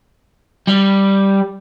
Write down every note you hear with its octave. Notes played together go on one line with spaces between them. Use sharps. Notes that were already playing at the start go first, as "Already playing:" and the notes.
G3